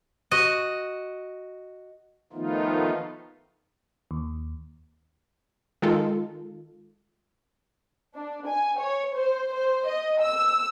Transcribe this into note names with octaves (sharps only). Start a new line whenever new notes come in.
F#4 D#5
D#3 F3 A3 B3 D#4 F4
D#2
D#3 G#3 F4 A4
D4
G#5
C#5
C5
C5
D#5
E6